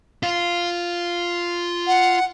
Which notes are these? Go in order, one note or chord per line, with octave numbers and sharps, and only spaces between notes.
F4
F#5